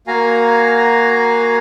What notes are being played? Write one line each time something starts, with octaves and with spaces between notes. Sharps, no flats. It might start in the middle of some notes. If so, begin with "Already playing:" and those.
A#3 F#4 F5 G#5 A#5